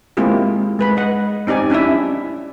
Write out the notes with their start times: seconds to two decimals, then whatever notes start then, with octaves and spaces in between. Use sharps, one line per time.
0.17 G#3 A#3 C4 E4 F4 G4
0.79 G#3 B4 B5
0.97 D#5 F#5
1.47 C4 D#4 G4 D5 G#5
1.70 C#4 D4 E4 G4 E5